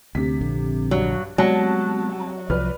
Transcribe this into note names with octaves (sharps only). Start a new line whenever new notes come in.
D2 C3 B6
A#1 D3
G2 F#3
C2 F#3 G#3 B3 A5 A#6
C2 F3 B4 D5 F6